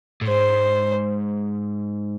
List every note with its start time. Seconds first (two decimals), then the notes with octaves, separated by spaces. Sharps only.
0.21 A2
0.27 G#2 C5